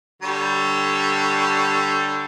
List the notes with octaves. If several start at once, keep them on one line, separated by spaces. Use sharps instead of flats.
D3 G3 C#5